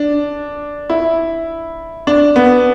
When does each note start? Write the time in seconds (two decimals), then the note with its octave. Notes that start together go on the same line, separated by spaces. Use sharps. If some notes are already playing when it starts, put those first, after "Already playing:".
Already playing: D4
0.90 E4
2.07 D4
2.36 B3